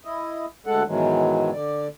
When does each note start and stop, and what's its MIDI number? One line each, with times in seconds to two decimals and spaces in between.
0.05 0.45 64
0.05 0.45 75
0.66 0.83 38
0.66 0.83 56
0.66 0.83 69
0.66 0.83 78
0.87 1.51 44
0.87 1.51 47
0.87 1.51 51
0.87 1.51 52
0.87 1.51 54
0.87 1.51 56
1.52 1.88 50
1.52 1.88 74